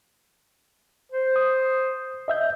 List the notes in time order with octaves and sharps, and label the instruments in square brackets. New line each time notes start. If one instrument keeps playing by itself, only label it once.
[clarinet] C5
[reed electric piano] D#6
D#5 E5 G6